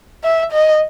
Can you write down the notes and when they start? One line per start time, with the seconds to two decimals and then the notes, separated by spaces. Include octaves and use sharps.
0.24 E5
0.52 D#5